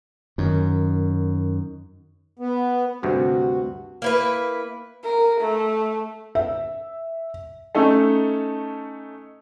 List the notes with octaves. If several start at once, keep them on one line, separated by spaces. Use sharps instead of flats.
F#2 D#3
B3
D2 G2 C3 F#4
A#3 E4 B4
A#4
A3
E5
A3 C#4 D#4 A4